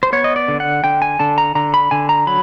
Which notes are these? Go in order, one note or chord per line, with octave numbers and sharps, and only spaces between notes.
C5
B3 C#5
D#5
D5
D3
F#5
D3 G5
G#5
D3 A5
A#5
D3 A#5
B5
D3 G#5
A#5
F#3 B5